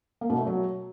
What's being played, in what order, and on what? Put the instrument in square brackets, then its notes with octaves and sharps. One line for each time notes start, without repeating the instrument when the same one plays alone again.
[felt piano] A#3
B2
A3
F#3